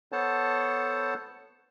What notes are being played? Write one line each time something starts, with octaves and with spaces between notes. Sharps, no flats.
B3 A4 C5 C#5 F#5 A5